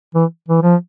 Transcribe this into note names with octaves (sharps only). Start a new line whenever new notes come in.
E3
E3
F3